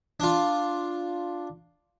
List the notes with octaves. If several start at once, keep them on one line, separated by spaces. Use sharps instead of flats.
D4 F4